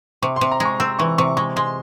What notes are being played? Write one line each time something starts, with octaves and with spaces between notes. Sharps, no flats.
C3 C#6
C6
C3
A#5
G#3
C#6
C4 E6
E3 C#6
C3 C#6
G#3 C#6
G#3 C6